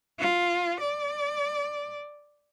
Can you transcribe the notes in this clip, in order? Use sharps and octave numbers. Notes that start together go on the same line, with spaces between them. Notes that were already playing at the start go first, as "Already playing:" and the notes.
F4
D5